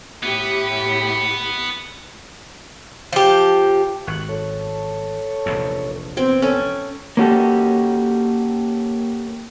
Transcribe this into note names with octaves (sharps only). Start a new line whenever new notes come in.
A2 B3 E4 G4
F3 G4
G#1 C#6 F#6
A4 C#5
F1 A#1 E2
B3 C4 G5 G#6
C#4 A4 G5
A#3 C#4 F#4 G4 A4